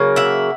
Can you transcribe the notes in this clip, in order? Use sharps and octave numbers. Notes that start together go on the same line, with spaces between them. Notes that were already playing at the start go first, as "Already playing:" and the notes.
Already playing: C#3 F#3 A#3
E5 F#5